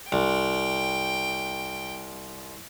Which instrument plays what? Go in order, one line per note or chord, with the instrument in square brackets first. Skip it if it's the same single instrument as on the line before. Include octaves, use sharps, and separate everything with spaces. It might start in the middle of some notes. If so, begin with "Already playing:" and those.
[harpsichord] C2 [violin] G5